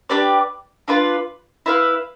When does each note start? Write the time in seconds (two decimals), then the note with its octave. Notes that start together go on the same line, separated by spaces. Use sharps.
0.10 D4 G4 B4 D5
0.88 D4 F4 B4
1.66 E4 B4 F5